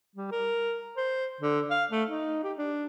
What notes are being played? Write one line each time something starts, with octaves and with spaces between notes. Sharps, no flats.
G3
A#4
C5
D3
F5
A3
D#4
G4
D4